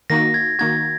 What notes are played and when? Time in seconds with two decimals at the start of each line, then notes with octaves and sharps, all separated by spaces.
0.10 D#3 A#3 D#4 F#4 A#6
0.34 G#6
0.59 D#3 A#3 D#4 F#4 G#6